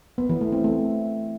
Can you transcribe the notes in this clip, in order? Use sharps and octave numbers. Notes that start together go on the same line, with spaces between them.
B3
E3
A3
C4
A3